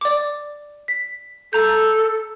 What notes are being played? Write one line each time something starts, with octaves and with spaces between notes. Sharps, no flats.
D5 D6
B6
A4 A#5 G6